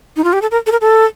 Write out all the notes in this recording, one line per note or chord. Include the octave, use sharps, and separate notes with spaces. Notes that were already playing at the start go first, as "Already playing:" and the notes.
D#4
F4
G4
A4
A#4
A4
A#4
A4